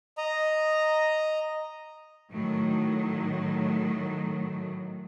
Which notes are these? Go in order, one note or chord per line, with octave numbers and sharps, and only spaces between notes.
D#5 A#5
A2 D#3 F#3